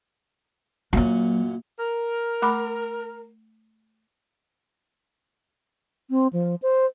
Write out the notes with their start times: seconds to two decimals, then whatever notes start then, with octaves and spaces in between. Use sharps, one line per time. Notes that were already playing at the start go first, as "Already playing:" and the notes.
0.93 F#2 A#2 F#3 A#3
1.78 A#4
2.42 A3 B5 D6
6.10 C4
6.33 F3
6.62 C5